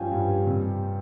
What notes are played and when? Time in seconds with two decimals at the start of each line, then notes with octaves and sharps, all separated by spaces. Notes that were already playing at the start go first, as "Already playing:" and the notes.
Already playing: G2 F3 C#4 F5 G5 G#5
0.12 G2
0.46 C3